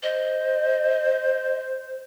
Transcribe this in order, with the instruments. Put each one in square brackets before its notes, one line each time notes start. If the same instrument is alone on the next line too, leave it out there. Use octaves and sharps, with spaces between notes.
[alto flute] C5 [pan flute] D#5